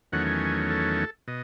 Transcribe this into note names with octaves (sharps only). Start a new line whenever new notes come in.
E2 D#3 F#3 A3 C#4 F#5
G#5
A4
B2 D#5